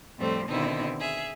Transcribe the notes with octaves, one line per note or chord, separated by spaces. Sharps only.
F2 A2 G3 A3 C4
B2 D3 D#3 C4 D#4 E4
G#4 E5